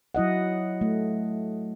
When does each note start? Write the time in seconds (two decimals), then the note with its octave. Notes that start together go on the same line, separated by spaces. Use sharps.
0.15 F#3 E4 D#5 F#5
0.81 A3